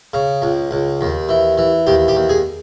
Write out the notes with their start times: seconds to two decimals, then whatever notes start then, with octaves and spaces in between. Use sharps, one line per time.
0.14 C#3
0.42 C#2
0.71 C#2
1.01 D#2
1.29 E3
1.58 E3
1.87 D#2 G4
2.08 G4
2.15 D#2
2.29 G#4